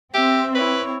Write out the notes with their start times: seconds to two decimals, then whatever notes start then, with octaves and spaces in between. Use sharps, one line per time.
0.14 C4 G4 E5
0.55 E4 B4 C#5